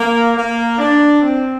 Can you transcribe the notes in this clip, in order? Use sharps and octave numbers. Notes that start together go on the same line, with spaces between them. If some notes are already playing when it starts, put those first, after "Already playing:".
Already playing: A#3
A#3
D4
C4